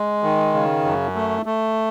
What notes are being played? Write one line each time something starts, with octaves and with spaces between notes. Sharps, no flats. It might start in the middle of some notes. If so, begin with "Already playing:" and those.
Already playing: G#3
D#3
C#3
F#2
A3
A3